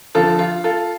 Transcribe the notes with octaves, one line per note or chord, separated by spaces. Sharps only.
F2 D3 F3 F4 A4
F4
F4 A4